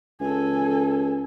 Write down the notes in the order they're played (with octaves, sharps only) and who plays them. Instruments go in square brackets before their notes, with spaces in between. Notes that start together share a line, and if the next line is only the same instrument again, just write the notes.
[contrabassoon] C#2 [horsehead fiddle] A4 G#5